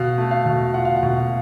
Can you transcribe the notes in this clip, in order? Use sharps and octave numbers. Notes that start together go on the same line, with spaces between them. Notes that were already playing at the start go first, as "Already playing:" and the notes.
Already playing: B2 F5
A3
F5
B2
F4 F#5
F5
F#5
B2